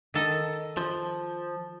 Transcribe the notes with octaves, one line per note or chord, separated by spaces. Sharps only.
D#3 A4 D#5
F3